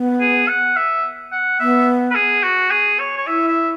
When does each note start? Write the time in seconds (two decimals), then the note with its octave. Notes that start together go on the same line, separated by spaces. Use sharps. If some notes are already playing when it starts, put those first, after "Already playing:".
Already playing: B3
0.21 G#4
0.48 F#5
0.76 E5
1.32 F#5
1.60 B3 E5
2.11 B4
2.15 G#4
2.43 F#4
2.71 G#4
2.99 C#5
3.17 C#5
3.27 E4 E5
3.48 E5